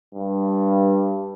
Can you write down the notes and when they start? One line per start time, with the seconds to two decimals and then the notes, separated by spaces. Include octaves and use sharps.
0.15 G2